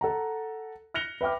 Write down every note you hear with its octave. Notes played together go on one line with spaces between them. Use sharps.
A4 F#5 A#5
F6 F#6 A#6 C#7 F7 G7
B4 E5 G5 D6 F6